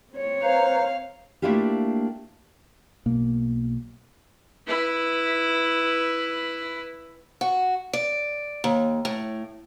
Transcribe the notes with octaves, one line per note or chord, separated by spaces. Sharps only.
C4 C#5
B4 C5 F5 A#5
A3 A#3 D4 E4 F4 G4
B1 B2 A#3
E4 B4
F#4
D5
D#2
A2